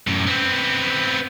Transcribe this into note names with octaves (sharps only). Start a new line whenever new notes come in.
F#2 A2
B3 C4